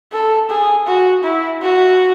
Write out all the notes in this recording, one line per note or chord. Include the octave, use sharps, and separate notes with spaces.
A4
G#4
F#4
E4
F#4